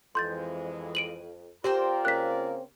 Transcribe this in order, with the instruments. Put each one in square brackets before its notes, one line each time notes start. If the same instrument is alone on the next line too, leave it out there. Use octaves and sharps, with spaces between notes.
[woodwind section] F2 [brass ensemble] E3 G#3 [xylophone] C6 G6 A6
[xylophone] D7 D#7 F#7
[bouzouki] C4 C5 G5 [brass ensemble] F4 A#4 D5 [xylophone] G4
[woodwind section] C#3 A#3 [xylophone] F#6 B6